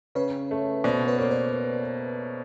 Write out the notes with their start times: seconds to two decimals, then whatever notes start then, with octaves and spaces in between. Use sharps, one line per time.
0.15 C#3 B4 C#5
0.51 A3
0.84 B2 C5 D5
1.08 B4 C#5
1.19 A#3 C#5
1.31 C5 D5